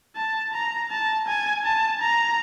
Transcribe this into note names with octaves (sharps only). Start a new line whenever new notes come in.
A5
A#5
A5
G#5
A5
A#5